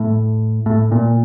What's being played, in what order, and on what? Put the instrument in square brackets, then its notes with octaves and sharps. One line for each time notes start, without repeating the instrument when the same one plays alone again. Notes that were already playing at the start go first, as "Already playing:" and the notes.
Already playing: [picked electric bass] A2
A2
A#2